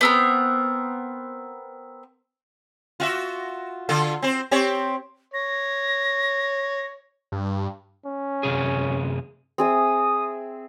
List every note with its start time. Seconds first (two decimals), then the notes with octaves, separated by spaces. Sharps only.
0.01 B3 C4 A#4
3.00 F4 F#4 E5
3.89 D3 F4 A4
4.22 C4 C5
4.51 C4 G4 C#5
5.34 C#5 A#6
7.32 G2
8.05 C#4
8.43 F#2 C3 G#4
9.58 C4 G#4 E5 D#6